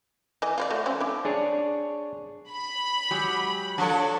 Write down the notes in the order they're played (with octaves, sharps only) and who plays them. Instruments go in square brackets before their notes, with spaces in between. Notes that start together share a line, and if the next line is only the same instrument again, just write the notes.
[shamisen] E3 D#5
F4 C5 D5
A3 F#4 A4
F3 C4 C#4
D4 E4
[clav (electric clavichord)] D4 G#4 C#5
[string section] B5
[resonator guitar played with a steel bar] F#3 G#3 G4
[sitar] F3 A4 [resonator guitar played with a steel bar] D4 C#5